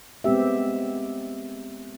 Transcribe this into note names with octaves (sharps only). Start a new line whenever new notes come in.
G#3 B3 C4 G4 E5